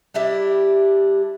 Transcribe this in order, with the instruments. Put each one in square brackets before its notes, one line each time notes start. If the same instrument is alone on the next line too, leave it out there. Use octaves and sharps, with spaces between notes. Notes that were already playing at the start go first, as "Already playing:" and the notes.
[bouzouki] G3 D4 E4 G4